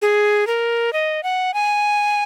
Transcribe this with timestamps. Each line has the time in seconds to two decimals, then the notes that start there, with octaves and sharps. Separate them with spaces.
0.02 G#4
0.47 A#4
0.93 D#5
1.23 F#5
1.54 G#5